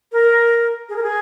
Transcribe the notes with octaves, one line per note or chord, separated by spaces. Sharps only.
A#4
G#4
A#4
G#4